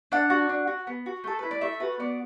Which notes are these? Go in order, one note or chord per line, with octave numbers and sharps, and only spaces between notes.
D4 F#5
F#4
D4
F#4
B3
F#4
A3 A4
E4 B4
D5
A3 E5
F#4 B4
B3 D5